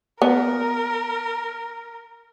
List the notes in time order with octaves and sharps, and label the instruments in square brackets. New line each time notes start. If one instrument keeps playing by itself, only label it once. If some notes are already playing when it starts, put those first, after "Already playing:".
[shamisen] B3 [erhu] A#4